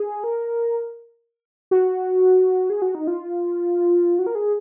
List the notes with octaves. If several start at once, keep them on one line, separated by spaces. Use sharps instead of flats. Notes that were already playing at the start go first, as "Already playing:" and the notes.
Already playing: G#4
A#4
F#4
G#4
F#4
D#4
F4
F#4
A#4
G#4